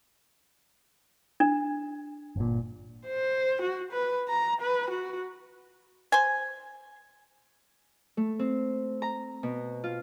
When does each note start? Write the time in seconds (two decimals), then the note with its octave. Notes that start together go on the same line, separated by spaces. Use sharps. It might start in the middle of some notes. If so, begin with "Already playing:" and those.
1.40 D4
2.36 G1 A#2
3.06 C5
3.62 F#4
3.93 B4
4.29 A#5
4.61 B4
4.91 F#4
6.12 C5 G#5
8.17 A3
8.39 C4
9.02 A#5
9.43 B2
9.84 F4